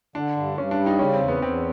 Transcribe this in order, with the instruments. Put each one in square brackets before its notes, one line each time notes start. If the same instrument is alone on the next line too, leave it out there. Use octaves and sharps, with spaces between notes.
[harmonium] D3 [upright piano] D4
[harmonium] G2
[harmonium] G2 [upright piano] C#4
[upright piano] D4
[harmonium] G3
[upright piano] D#4
[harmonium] C#3 [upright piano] C#4
[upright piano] C4
[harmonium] E2
[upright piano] B3
[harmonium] E2 [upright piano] C4